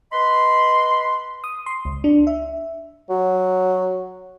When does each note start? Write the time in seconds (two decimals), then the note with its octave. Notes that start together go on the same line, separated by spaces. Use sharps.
0.12 B4 D#5 B5 C6
1.44 D#6
1.66 C6
1.85 C#2
2.04 D4
2.27 E5
3.09 F#3